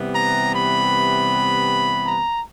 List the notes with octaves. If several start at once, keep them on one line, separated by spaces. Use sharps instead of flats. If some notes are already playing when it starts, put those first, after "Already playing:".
Already playing: C3 E3 G3 B3
A#5
B5
A#5